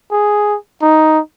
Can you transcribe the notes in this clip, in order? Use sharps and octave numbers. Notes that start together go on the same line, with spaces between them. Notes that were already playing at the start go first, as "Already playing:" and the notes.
G#4
D#4